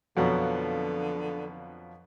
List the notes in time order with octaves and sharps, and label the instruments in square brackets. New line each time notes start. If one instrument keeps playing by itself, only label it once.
[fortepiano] F2 B2 F#3 [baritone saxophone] D3